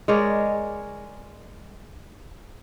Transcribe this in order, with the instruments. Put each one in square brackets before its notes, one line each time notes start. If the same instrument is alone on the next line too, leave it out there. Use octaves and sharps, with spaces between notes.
[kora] G#3 A#4 C#5 D5